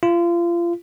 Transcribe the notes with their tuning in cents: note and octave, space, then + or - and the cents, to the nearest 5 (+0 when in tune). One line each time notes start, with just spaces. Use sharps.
F4 -30